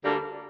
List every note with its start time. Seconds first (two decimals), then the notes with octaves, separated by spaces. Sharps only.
0.04 D2 D3 G3 A#3 D4